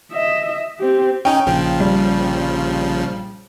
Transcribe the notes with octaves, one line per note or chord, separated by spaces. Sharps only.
D#5 E5
C4 G4
C#4 D#4 G5
A#1 C#3 F3
G3